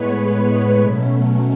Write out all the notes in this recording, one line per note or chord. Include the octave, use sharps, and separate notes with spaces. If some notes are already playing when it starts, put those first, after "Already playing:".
Already playing: A2 G#3 B3 B4 C#5
B4
B2 F#3 A3 C#4